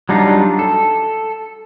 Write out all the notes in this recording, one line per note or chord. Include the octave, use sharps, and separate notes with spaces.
F#3 G3 D4 D#4 F4
A4